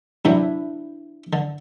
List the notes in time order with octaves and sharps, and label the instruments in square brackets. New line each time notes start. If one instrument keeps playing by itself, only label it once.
[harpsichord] G2 C3 F#3 [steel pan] D4 E4
[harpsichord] D3